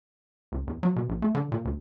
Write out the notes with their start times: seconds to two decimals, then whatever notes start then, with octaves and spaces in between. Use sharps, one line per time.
0.52 C#2
0.67 E2
0.83 F#3
0.96 B2
1.09 A#1
1.22 A3
1.35 D3
1.52 A#2
1.65 D2